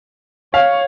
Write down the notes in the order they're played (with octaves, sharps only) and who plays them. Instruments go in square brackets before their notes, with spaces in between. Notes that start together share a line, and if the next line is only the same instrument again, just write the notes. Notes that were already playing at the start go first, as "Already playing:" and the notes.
[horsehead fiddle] C#5 [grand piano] F5